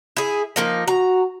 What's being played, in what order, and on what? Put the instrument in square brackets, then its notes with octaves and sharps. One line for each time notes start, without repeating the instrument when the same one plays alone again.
[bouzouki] E4 G#4
F3 A#3 D#4
[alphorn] F#4 [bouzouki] A#5